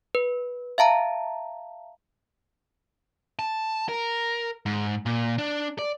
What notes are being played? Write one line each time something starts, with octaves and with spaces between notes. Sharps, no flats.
B4
E5 F5 A5 A#5
A5
A#4
G#2
A#2
D4
D5